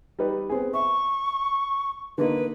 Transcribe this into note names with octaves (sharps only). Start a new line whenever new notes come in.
G3 D#4 B4
B3 C4 G#4
E5 C#6
D3 A#3 D#4 B4